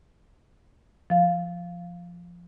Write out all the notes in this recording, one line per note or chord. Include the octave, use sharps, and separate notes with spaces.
F3 F5